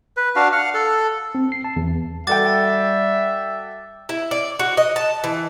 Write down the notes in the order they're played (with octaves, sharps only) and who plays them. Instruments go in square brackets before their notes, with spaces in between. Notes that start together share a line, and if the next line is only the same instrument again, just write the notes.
[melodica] B4
D4 F#4 F5
F5 F#5
A4
[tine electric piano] C4
C7
A5
E2
[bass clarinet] G3 [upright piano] F#4 A4 G5 [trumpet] E5 [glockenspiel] D6 A6
[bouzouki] E4
D5
F#4
D#5
A5
E3